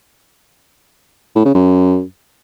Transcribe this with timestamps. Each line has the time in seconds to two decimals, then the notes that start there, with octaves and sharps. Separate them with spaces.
1.36 A2
1.45 C#3
1.55 F#2